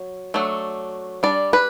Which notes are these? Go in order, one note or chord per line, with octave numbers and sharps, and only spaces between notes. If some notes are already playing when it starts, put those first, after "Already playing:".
Already playing: F#3
F#3 A3 D4
G3 D4 D5
B4